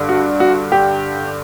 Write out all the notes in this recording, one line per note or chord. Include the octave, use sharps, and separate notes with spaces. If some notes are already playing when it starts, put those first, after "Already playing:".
Already playing: G2 D3
F#4
F#4
G4